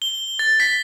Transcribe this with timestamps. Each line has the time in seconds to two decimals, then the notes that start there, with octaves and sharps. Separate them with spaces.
0.02 G7
0.39 A6
0.60 B6